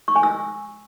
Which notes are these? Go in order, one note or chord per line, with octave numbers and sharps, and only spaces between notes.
C#6
G#5
E6